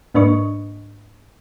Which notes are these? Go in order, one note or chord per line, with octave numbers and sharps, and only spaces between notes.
G#2 A#3 D4 B4 D#5 C#6